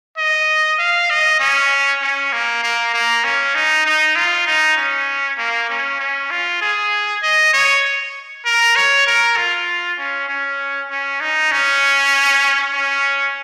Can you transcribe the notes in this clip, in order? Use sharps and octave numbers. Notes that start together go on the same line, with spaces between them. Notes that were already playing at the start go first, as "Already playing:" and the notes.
D#5
F5
D#5
C#4
C#4
A#3
A#3
A#3
C#4
D#4
D#4
F4
D#4
C#4
A#3
C#4
C#4
F4
G#4
D#5
C#5
A#4
C#5
A#4
F4
C#4
C#4
C#4
D#4
C#4
C#4